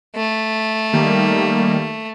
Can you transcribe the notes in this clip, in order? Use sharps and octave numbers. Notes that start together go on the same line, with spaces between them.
A3
D#3 G3 A#3